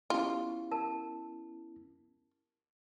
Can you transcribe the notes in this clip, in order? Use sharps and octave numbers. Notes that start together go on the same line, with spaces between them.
B3 C#4 E4 F4 G4 C6
A#4 A5